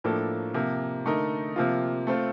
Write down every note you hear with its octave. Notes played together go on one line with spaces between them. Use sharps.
A2 F3 A#3 D4 A4
C3 F3 A#3
D3 A3 D#4 A#4
C3 F3 A#3 F4
A3 C4 F4 A4